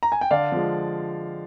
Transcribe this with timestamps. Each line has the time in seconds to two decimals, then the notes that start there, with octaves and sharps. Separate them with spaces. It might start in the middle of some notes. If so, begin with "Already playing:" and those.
0.03 A#5
0.12 G#5
0.21 G5
0.31 D3 D5 F5
0.52 F3 G#3